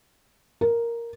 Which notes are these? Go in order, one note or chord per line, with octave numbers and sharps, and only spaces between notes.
A#4